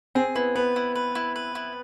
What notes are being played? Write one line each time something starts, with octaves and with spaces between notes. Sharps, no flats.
C4 G#4
B3 E4
B3 B4
E4
B4
E4
B4
E4